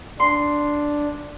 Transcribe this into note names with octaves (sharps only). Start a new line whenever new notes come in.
D4 C6